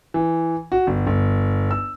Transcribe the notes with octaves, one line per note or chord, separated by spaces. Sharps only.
E3
F#4
G1
G1
E6